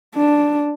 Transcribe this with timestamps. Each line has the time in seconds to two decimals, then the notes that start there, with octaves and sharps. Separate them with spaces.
0.15 D4